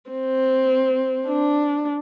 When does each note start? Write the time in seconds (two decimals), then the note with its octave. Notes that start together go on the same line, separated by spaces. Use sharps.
0.11 C4
1.27 D4